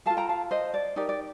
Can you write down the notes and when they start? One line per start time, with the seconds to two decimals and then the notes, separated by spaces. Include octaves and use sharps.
0.06 F4 A4 F5 A5
0.17 G5 A#5
0.29 F5 A5
0.51 C5 D#5
0.74 D5
0.96 D#4 G4 A#4 D5
1.09 D5